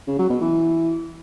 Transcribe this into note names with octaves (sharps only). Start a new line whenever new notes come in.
C#3
F#3
B2
E3